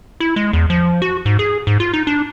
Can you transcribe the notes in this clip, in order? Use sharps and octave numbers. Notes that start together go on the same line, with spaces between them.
E4
G#3
E2
F3
F#4
G#2
G#4
G#2
F4
D#4
D4